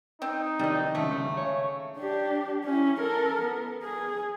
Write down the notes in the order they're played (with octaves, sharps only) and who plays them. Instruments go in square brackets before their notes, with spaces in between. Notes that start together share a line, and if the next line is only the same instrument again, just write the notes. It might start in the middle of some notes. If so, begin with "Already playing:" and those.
[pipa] C4 [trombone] D#4
[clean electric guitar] F2 C3 D#3 [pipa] G3 D#5
[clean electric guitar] D#2 G#2 C#3 [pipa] A3
[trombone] C#3 [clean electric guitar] C#5
[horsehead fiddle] D4 G4
C#4 E4
A4 A#4
B3
G#4